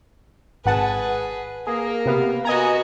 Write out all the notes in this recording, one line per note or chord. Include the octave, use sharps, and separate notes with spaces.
G#1 G#4 B4 F#5 A5
A#3 G#4 A#4
C3 B3 F5
B3 F#4 D#5 G#5 A#5